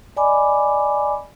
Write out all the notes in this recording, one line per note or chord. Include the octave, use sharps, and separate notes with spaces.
D5 D#5 G#5 B5 D6